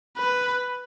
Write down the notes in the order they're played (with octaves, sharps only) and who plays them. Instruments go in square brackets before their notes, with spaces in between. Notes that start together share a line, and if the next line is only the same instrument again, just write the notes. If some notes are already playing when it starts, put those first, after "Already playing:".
[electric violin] B4